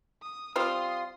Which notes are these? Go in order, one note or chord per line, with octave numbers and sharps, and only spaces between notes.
D#6
G3 C4 F4 C6 D#6